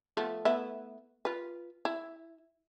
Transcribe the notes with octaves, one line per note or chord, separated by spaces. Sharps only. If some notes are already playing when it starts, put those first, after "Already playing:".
F3 A3 B3
A3 B3 E4
F4 B4
E4